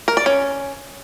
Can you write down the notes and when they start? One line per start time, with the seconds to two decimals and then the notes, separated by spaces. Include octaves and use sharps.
0.08 A#4
0.17 D5
0.26 C#4